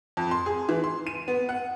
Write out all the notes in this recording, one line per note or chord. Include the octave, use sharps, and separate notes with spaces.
F2
C6
G#4
E3
C6
D#7
B3
F#5